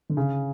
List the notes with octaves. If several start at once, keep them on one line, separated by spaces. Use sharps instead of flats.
D3
C#3